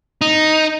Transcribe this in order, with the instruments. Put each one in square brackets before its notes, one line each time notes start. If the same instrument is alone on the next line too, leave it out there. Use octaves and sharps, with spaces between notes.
[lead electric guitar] D#4